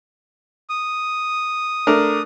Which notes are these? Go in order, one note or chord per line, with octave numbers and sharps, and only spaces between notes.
D#6
A3 D4 A#4